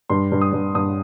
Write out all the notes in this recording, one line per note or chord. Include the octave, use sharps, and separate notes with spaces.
G2 C6
G2
D#6
G2
G2 D#6